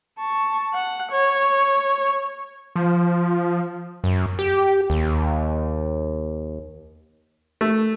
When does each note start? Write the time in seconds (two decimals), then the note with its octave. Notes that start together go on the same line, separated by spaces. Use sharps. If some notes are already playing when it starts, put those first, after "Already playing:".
0.19 A5 C#6
0.74 F#5
1.11 C#5
2.76 F3
4.04 F#2
4.39 G4
4.90 D#2
7.61 A3